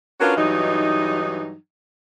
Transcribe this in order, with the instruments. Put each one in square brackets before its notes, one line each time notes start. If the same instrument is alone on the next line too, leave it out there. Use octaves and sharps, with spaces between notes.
[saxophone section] C#4 D4 F4 F#4 A#4 B4
G2 E3 F#3 D#4